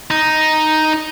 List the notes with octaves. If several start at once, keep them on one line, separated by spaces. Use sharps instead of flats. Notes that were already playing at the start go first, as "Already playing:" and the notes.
D#4